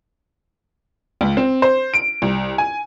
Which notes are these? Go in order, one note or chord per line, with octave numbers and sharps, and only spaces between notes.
C#2
C4
C5
D7
C2
G#5